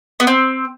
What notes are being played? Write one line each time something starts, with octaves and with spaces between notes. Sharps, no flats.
B3
C4